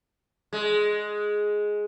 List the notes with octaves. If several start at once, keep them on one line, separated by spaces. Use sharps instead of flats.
G#3